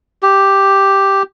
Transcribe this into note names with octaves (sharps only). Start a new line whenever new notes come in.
G4